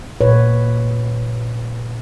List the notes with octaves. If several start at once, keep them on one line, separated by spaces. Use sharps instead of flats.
A#2 B4 C#5